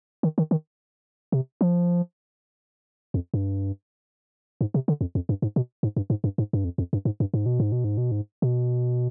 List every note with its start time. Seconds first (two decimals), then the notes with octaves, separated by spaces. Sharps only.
0.23 D#3
0.38 D#3
0.51 D#3
1.32 C3
1.61 F3
3.14 F2
3.34 G2
4.61 G#2
4.74 C3
4.88 D3
5.01 F2
5.15 F2
5.29 G2
5.42 G#2
5.56 B2
5.83 G#2
5.96 G2
6.10 G#2
6.24 G2
6.38 G#2
6.53 G2
6.64 F2
6.78 F2
6.93 G2
7.05 G#2
7.20 G2
7.34 G#2
7.46 B2
7.60 G#2
7.72 B2
7.84 G#2
7.98 B2
8.11 G#2
8.42 B2